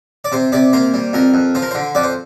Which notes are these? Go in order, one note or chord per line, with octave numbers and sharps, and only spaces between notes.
D5
C3 C5
C3 D5
A#3 C5
G3
F2 A#4
F2
F3 C5
A#4
D3 C5
F2 D5
C5